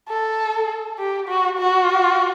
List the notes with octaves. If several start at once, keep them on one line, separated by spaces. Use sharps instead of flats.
A4
G4
F#4
F#4